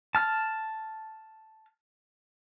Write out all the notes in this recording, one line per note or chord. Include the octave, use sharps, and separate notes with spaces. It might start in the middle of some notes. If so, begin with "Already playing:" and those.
A5 F6